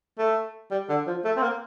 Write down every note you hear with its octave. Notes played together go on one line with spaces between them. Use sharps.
A3
G3
D3
F3
A3
C4
A#3